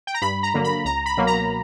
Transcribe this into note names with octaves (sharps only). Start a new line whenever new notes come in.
G5
A#5
G2 B5
A#5
D3 F#3 A#3
B5
C#2 A#5
B5
B2 F#3 A#3
A#5